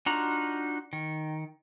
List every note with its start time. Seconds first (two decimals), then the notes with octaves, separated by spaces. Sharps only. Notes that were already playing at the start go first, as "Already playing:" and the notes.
0.06 D4 D#4 F4 F#4 A#5
0.93 D#3